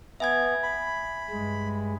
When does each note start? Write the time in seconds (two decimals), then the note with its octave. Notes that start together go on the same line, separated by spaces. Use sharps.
0.20 B3 E5 G#5 G#6
0.63 B5
1.30 G2 G#3